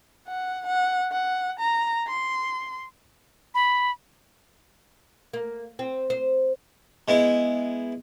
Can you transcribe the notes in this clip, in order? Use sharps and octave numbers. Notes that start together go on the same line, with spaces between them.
F#5
F#5
F#5
A#5
C6
B5
A#3
C4
C5
G#3 B3 E4